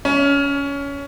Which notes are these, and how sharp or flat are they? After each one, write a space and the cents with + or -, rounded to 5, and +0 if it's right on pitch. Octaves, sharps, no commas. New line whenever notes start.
C#4 +20